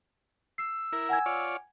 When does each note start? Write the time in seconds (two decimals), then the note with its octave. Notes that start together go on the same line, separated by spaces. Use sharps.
0.58 E6 C7
0.93 E4 A#4
1.09 F#5 G#5 G#6
1.26 F4 C#5 D5